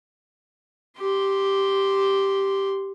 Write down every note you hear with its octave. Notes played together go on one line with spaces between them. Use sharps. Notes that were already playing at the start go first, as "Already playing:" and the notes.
G4 C6